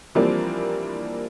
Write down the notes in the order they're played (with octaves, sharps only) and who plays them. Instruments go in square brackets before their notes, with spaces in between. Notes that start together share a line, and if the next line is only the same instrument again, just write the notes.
[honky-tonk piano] E3 F3 G3 A#3 C4 D4